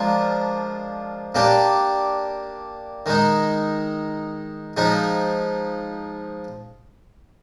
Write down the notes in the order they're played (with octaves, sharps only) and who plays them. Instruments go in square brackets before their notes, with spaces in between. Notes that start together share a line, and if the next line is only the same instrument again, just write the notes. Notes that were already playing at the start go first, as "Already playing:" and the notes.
Already playing: [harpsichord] F3 G#3 D4 F4 A#4
A#3 D4 G4
D#3 G#3 D#4
F3 G#3 D#4